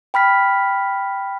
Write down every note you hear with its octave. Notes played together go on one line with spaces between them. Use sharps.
G5 B5 F6 B6